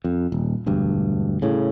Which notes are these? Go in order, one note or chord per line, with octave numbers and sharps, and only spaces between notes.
F2
D#1
E1 D2 G2
A2 C#3